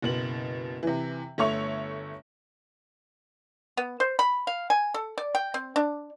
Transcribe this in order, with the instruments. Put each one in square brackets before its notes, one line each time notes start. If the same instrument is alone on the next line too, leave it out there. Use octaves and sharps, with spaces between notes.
[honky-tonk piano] F#1 B2 F#7
C3 E3
G1 A3 C#5 E5 C#6 F7
[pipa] B3
C5
B5
F5
G#5
A4
D5
G5
C4
D4